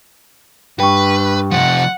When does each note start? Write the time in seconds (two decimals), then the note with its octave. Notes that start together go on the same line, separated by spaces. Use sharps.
0.80 G2 B4 G5 C#6
1.51 C3 F3 F#5